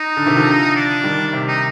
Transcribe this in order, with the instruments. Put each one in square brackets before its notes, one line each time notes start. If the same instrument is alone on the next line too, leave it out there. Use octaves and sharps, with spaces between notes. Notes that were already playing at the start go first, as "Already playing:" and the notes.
Already playing: [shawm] D#4
[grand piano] D3
C3 D#3
D3 F3
[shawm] D4
[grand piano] D#3 G3
C3
[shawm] D#4